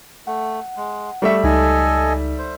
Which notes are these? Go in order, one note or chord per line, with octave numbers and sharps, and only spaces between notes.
A3 F#5
G#3
G3 A3 E5 C#6
C#2 D#4 A4 D#5 G#5
C5